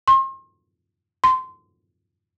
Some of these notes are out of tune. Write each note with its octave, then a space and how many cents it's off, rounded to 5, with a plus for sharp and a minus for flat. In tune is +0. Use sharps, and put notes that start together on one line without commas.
C6 +40
C6 -20